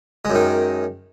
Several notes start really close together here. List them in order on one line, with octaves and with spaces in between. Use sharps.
G#3 F#2 D#3